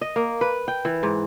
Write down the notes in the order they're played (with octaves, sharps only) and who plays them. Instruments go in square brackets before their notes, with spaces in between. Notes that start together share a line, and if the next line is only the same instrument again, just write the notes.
[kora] D#5
A#3
B4
G5
E3
G#2